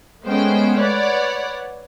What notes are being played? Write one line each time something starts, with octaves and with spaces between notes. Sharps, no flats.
G#3 A3 B3 C#4 C5 G5
B4 C#5 D5 F#5